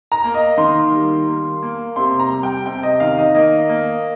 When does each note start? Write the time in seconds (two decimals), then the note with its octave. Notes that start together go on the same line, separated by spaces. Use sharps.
0.12 A#5
0.24 A#3
0.34 D#5
0.57 D#3 C6
0.92 G3
1.28 A#3
1.63 A#3
1.96 C3 C6
2.20 A#5
2.32 G3
2.43 G5
2.66 C3 G5
2.83 D#5
3.00 D#3 F5
3.19 D#5
3.35 A#3 D#5
3.69 A#3